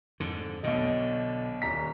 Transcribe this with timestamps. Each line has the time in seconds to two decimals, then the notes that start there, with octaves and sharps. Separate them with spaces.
0.20 F2 G#2 D3
0.63 B1 B2 D3 D#5
1.62 D#1 A#5 B6